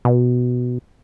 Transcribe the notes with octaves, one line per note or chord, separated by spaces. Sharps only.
B2